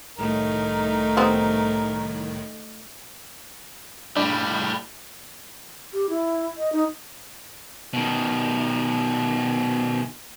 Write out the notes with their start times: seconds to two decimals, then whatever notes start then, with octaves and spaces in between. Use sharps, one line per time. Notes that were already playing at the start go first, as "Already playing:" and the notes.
0.18 C2 A2 D#3 A3 D#4 A#4
1.17 B3 C4 G4
4.16 A2 G3 D4
5.92 G4
6.09 E4
6.57 D#5
6.72 D#4
7.93 B2 D#3